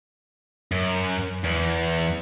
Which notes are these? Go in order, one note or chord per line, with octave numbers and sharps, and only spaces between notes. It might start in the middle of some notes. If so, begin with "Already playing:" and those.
F#2
E2